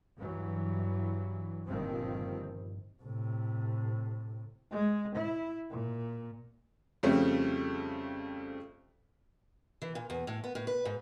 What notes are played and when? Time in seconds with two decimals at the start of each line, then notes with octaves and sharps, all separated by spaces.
0.18 G2 E3 F#3
1.67 G1 G2 A#2 D#3 F3 C4
3.03 A2 C3
4.71 G#3
5.16 E4
5.70 A#2
7.03 F2 C#3 G3 A3 C4 C#4
9.82 E3
9.95 A#2
10.10 E2
10.27 A2
10.44 B3
10.55 A2
10.67 B4
10.85 G#2